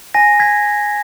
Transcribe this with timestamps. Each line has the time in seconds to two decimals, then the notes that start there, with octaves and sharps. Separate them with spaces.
0.14 G#5 A#6
0.40 G#6 B6